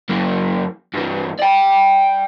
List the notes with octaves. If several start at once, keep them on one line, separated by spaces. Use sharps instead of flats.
F#2 A#3
G2 E3
D5 G5